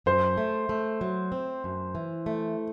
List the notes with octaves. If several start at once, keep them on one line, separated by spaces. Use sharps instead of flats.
F#2 C5
A3
A3
F#3
C4
F#2
E3
A3